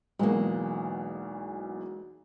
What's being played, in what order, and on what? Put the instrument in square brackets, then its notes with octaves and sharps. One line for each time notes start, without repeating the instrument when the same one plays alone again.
[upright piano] B1 E2 B2 [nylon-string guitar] G#3 A#3